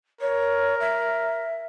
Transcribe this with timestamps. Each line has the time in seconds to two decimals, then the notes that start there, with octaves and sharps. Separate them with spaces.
0.21 A#4 C#5
0.80 E5